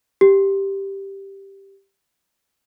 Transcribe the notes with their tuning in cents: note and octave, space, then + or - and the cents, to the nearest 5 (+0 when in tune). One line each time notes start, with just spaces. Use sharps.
G4 +0